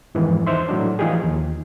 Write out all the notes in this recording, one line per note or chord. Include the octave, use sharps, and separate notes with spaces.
F2 G#2 D#3 E3
E2 D#4 C5 E5 C6
A2 F#3 D4
E3 F3 D#4 F4 G4 G#4
D#2